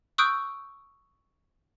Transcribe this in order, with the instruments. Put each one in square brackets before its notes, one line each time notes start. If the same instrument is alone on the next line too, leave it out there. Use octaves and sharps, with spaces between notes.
[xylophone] C#6 D#6 E6 F#6 G6 D7